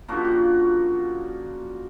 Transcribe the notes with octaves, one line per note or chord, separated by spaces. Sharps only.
C#3 F3 A#3 D4 F#4
G4
F#4